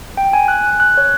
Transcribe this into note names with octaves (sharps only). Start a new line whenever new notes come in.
G5
G#5
F#6
F#6
F#6
C#5